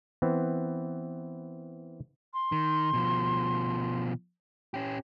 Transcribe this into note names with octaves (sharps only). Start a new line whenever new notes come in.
E3 B3 C4
C6
D#3
B2 F3
C#4 G4